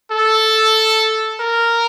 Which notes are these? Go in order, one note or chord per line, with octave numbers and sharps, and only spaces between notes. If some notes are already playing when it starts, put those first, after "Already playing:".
A4
A#4